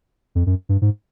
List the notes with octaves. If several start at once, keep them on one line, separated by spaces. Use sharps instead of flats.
F2
F#2
G2
G#2